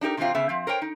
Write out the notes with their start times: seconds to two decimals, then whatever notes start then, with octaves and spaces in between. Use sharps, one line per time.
0.01 D4 D#4 G4 A#4 D5
0.17 C3 E3 F#3 A3 C4 F4
0.35 C#3 B3 E5
0.49 F3 C4
0.67 A#4 C5 C#5 G5
0.82 D#4